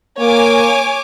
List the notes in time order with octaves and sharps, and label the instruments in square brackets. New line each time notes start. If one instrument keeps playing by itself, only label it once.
[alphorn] A#3 [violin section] C#5 G#5 D6